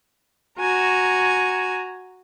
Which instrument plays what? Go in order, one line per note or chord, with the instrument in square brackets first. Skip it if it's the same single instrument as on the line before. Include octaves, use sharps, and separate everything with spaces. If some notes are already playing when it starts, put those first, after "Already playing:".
[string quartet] F#4 G#5 A#5